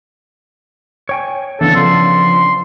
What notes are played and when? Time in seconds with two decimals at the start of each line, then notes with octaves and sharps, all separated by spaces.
1.09 C#5 G5 G#5
1.61 C#3 E3 B3 D4 A4
1.76 F3 C6